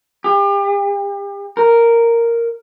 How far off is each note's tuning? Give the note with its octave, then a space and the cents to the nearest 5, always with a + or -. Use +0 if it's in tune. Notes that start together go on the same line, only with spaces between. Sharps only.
G4 +35
A#4 -5